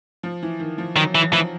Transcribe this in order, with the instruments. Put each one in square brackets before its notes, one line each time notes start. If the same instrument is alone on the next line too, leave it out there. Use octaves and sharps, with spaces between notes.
[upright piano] F3
E3
D#3
F3
[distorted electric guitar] D#3 [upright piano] F#3
[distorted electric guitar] E3
[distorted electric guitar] E3 [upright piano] F3